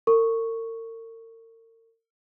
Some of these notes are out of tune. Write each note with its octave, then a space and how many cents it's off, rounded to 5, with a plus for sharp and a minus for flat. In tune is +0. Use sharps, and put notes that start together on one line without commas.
A#4 -45 C#6 +0